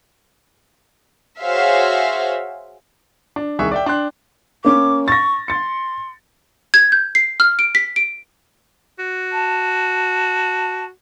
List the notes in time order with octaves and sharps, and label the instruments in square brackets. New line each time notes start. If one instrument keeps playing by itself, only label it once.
[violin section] F#4 G#4 C5 C#5 E5 F5
[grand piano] D4
C2 D#3 G#4 E5 C#6 F#6
D5 E5 G5
D4 G5 C6 F#6
[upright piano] A#3 C#4 [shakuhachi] D6
[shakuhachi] C#6 [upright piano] A6 A#6
[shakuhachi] C6 [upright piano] A6 C#7
[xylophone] G#6
G6
C7
F6
D7
B6
D7
[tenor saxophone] F#4
[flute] A5